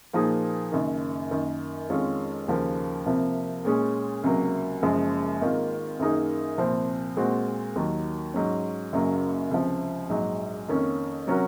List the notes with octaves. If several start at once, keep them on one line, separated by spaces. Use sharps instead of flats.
A#2 F3 A#3 D#4 G#4
F#1 F#2 D#3
F#2 D#3 A#3
F2 D#3 G#3 C#4 F4
D#2 C#3 F3 A#3
C2 C3 F3 A#3
A#2 G#3 C#4 G#4
C#2 C3 F#3 A#3
F#1 F#2 F3 G#3
G#1 G#2 D#3 A#3 F4
F#2 D#3 A#3 D#4 G#4
C2 A#2 F3 C4
A#2 G#3 C4 F#4
D#2 D#3 F#3
G#2 F#3 C#4
F#1 F#2 C#3 F#3 A#3
C#2 C3 F3
A#1 G#2 F#3
F2 D#3 A#3 C#4
C3 F#3 C#4 F#4 A#4